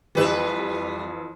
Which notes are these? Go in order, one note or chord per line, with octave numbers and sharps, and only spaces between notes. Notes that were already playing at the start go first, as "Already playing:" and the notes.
F2 E3 G3 B4 E5